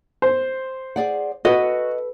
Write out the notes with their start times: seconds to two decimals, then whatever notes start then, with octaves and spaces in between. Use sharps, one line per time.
0.22 C5
0.96 G#4 D5 F#5
1.45 F#4 A4 B4 D#5